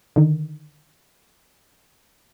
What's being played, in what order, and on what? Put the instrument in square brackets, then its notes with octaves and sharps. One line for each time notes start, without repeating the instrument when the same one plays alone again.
[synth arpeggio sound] D3 D#3